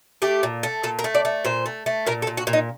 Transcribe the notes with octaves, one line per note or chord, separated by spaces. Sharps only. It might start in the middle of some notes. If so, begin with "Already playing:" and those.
A3 G4
A#2
A3
A#2 A4
A#4
A3
D5
A3
A#2 C5
A3
A3
A#2 A#4
A4
A#2
F#4
A#2
D#4